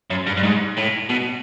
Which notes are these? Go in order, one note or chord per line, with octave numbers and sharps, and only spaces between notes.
F#2
G2
G2
G#2
A2
B2